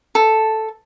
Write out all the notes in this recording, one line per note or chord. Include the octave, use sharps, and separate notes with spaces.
A4